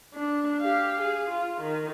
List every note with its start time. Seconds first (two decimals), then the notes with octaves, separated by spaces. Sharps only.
0.14 D4
0.60 G4 F5
1.01 G#4
1.30 F4
1.61 D#3